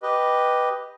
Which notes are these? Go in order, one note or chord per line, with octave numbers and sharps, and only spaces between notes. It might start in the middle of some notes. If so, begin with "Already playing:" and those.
G4 B4 D#5